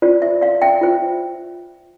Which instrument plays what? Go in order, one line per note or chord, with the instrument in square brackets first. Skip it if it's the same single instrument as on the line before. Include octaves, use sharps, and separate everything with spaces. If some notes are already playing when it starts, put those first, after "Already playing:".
[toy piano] F4 C5 D5
E5
D5 F5
E5 G5
F4 C5